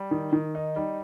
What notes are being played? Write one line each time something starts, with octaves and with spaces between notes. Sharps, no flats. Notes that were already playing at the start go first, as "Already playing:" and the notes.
Already playing: G3
D#3
D#3
D#4
G3